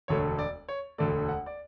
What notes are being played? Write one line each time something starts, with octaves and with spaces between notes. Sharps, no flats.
E1 D2 D3 A3 C#5
D5
C#5
E1 D2 D3 A3 D5
F#5
D5